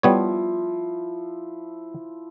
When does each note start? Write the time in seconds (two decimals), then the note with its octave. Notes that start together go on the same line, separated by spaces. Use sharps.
0.03 F3 G3 B3 E4 C#5